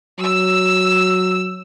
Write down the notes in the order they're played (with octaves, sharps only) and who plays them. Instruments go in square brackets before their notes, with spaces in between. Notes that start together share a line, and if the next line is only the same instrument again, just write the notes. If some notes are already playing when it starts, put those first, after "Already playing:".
[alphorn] F#3 [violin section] E6